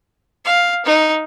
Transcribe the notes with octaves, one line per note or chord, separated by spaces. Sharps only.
F5
D#4